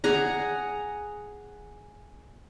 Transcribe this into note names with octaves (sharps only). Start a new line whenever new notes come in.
G#4 F#5 A#5